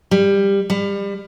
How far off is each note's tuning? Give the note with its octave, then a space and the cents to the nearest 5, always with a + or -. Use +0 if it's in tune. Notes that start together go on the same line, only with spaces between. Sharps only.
G3 +15
G3 +30